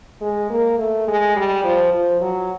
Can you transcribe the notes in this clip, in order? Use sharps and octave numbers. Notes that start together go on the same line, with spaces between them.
G#3
A#3
A3
G#3
G3
F3
F3
F#3